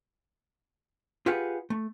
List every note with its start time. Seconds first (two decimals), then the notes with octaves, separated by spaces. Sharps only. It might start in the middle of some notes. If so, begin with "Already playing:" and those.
1.26 F4 G4 G#4 B4 F#5
1.70 A3